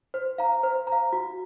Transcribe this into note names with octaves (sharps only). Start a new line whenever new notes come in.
C5
F5 A#5
C5
A#5
F5
F#4